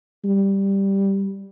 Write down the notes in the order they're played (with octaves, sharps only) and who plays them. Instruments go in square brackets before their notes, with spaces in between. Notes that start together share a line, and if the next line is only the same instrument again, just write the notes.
[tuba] G3